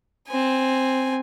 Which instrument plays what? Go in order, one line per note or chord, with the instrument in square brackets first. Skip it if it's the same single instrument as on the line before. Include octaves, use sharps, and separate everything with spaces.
[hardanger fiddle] C4 G#5